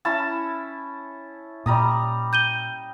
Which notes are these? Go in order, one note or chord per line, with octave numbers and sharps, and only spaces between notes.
C#4 E4 A5
A#2 G3 A#5 D#6
G6 D#7 G7